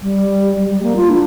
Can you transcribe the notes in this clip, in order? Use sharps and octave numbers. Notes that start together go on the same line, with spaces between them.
G3
G3
G3
A#3
F4
D4